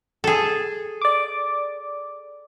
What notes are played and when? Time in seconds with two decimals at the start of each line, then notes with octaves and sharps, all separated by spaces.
0.24 G#4 A4
1.01 D5 D6